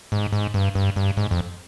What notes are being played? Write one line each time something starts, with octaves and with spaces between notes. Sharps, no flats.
G#2
G#2
G2
G2
G2
G#2
F2